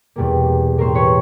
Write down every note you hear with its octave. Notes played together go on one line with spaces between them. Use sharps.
E2 B2 G3 A#3
A2 E3 G3 A#3 A#4 C5
B4 C#5